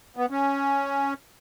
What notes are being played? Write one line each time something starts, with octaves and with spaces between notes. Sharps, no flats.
B3
C#4